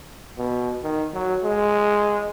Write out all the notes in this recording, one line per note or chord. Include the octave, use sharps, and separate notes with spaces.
B2
D#3
F#3
G#3